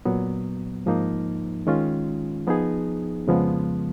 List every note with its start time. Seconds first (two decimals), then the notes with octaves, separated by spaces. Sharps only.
0.05 A#2 F#3 B3
0.86 G#2 F3 A#3 D#4
1.67 D#3 G#3 C#4 F4
2.47 F3 B3 D#4 G#4
3.27 F2 C#3 F3 G#3 B3